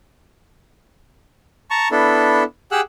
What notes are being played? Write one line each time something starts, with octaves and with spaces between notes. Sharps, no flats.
A5 A#5 C#6
B3 D4 E4 A4
G4 G#4 F#5 E6 F#6